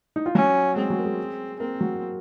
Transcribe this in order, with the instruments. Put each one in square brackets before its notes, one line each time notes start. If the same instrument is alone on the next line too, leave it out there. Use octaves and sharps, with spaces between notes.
[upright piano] D#4
F4
[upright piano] F#3 F#4 [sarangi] C#4
[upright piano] G#3 G#4 [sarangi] C4
[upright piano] F#3 F#4
A#4
G#3 G#4
[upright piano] A#3 A#4 [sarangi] C4
[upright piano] F#3 F#4